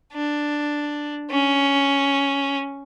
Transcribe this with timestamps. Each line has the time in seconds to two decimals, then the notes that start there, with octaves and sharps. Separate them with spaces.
0.13 D4
1.31 C#4